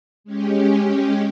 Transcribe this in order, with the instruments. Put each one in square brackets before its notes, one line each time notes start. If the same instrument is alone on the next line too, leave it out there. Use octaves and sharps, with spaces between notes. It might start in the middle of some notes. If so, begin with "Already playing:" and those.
[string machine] G#3 C#4 G4